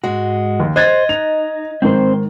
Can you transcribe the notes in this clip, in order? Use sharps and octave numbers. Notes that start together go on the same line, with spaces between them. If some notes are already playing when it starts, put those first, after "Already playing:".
G#2 G#3 F#4
D#2
C5 D#5 F#6 G#6 A6
D#4 F7
G#2 D#3 C4 C5